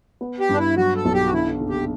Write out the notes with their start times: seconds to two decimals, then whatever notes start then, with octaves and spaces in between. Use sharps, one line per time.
0.21 B3
0.40 G4
0.49 G2 D4
0.58 E4
0.77 F#3 F#4
0.96 A4
1.05 B1
1.14 G4
1.26 F#4
1.33 D3 E4
1.61 F#1
1.70 G4